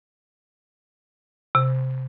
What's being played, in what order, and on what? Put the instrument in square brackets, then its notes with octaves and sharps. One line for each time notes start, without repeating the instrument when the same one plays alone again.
[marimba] C3